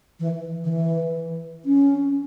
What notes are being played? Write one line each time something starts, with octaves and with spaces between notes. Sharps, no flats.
E3
D#3
E3
C#4